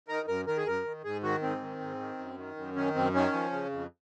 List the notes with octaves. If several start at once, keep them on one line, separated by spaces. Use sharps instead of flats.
D#3 A#4
F#2 A#4
D#3 A#4
G#4
F#2 A#4
D#3
G#2 G#4
D#3 F#4
G#2 C4
D#3
G#2
D#3
F#2
D#3
F#2
D#3 C#4
F#2 C4
D#3 C#4
F3
C#3
F2